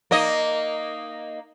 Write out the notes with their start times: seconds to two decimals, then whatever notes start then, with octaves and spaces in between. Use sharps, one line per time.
0.11 A#3 D#4 D#5